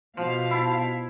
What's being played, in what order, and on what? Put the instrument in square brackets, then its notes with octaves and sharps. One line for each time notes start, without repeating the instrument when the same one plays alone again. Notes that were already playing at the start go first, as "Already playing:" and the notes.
[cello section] B2 F5 [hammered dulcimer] F3
[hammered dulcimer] E4 A5